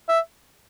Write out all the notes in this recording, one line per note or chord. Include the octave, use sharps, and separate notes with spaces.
E5